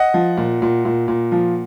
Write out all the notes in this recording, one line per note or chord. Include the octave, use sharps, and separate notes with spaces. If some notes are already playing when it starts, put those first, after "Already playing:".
Already playing: D#5 F#5
F3
A#2
A#2
A#2
A#2
F3